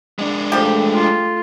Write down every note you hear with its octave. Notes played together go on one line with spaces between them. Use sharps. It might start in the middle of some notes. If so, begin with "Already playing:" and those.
G#3 D4
F3 A3 G4
F4